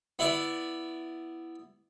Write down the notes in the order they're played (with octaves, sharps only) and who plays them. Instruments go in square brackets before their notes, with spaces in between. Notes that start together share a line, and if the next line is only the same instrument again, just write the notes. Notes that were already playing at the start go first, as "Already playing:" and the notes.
[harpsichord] B3 E4 D5 E5